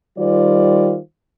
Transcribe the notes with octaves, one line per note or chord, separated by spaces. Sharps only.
D#3 G3 F4 C5 D5